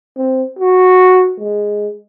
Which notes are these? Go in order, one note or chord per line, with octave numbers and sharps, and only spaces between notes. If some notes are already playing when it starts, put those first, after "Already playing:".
C4
F#4
G#3